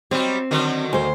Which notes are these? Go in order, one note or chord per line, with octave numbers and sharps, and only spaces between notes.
F#3 G3 C4 G4
D3 D#3 F#3
D2 C5